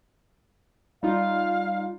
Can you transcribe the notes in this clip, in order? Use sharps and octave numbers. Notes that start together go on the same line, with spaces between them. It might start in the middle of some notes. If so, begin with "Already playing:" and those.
G3 D#4 F4 F5